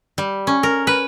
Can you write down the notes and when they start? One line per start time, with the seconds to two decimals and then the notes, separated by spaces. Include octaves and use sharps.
0.18 G3
0.47 C#4
0.63 A#4
0.87 B4